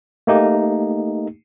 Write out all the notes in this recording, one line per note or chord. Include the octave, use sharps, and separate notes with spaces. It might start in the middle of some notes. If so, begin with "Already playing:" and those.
A3 A#3 D#4 G4